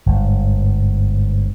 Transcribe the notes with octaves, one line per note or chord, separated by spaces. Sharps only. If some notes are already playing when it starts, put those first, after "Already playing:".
G1 G#2